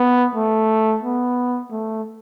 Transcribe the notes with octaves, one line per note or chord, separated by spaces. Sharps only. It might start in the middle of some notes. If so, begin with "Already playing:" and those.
Already playing: B3
A3
B3
A3